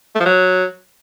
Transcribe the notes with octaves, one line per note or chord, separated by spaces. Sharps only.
A3
F3
F#3